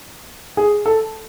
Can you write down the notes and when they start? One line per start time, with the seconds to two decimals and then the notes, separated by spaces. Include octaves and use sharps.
0.57 G#4
0.86 A4